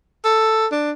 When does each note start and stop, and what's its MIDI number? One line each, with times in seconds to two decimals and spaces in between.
0.25 0.66 69
0.72 0.92 62